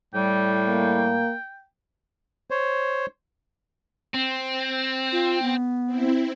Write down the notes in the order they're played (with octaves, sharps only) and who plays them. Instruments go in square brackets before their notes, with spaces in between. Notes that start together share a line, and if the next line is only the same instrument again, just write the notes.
[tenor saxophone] A2 [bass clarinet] G3 [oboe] G5
[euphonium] A#3
[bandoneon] C5 C#5
[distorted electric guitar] C4
[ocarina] F4
B3
[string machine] C4 E4